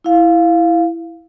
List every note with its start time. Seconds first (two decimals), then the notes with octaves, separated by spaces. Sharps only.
0.04 E4 F5